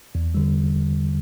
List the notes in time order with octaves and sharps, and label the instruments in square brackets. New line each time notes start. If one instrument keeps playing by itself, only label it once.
[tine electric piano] E2
D3 G3